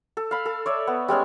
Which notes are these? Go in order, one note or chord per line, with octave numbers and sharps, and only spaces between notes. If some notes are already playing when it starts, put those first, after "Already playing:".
A4
F5 B5
A4
C#5 D5 E5
B3
G3 G#3 C#4 G#4